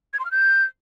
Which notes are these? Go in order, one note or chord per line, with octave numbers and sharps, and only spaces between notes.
G#6
C6
F6
G6